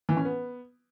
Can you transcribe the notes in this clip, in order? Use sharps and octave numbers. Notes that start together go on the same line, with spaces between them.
E3
C#4
B3